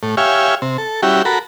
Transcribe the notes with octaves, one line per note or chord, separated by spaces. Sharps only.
A2
G4 C#5 E5 F5 G#5
C3
A4
G3 C#4 E4 F#4 G4
F#4 A4 A#4 B5